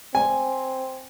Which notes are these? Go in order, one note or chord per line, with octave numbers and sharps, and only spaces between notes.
C4 G#5